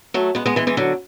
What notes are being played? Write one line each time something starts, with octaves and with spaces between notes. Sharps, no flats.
F#3 A3
G#3 B3
G#3 B3
E3 G#3
E3 G#3
D3 F#3